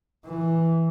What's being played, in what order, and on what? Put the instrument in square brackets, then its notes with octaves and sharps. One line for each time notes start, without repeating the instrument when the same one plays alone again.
[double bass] E3